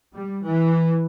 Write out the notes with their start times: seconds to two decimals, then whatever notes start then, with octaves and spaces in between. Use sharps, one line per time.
0.12 G3
0.44 E3